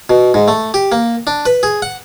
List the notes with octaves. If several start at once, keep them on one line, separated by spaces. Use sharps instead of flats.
B2
G#2
A3
G4
A#3
D4
B4
G#4
F#5